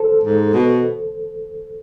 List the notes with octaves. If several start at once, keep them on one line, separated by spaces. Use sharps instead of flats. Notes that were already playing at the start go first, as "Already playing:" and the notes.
Already playing: A4 C5
G#2
B2